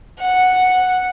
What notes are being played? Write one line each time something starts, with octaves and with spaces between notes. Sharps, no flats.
F#5